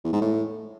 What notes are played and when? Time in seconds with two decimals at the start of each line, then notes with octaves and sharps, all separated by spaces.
0.05 E2
0.13 G#2
0.21 A2